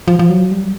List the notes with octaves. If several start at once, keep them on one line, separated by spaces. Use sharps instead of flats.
F3
F3
F#3
G3